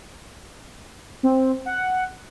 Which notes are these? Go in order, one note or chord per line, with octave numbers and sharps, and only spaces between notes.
C4
F#5